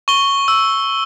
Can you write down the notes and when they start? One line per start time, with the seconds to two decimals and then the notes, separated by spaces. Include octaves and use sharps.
0.08 C#6 G7
0.48 E6